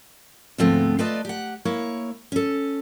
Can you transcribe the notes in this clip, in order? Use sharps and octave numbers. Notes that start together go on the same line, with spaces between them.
D2 G#2 F3 A3 B3 C4
A3 F4 B4 D5 D#5 A5
G4 F#5
A#3 E4 C#5
C#4 A4